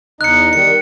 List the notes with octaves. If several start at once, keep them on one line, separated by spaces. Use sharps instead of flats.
E2 D#4 D#5 F#6 C#7
D#3 G3 C#7